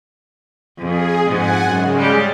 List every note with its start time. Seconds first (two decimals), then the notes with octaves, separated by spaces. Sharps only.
0.78 F2 G#4
1.26 F2 G#2 F#5 G#5
1.66 F#2 C#3 G#3
1.97 G3 G4